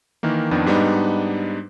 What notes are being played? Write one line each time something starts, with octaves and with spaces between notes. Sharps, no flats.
D#3 E3 A#3
F2 D#3 B3 D4
G#2 G3 B3 D4 D#4